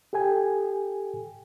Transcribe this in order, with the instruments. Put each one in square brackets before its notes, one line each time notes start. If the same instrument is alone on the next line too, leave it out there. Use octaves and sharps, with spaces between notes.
[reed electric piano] G4 A4 G5 G#5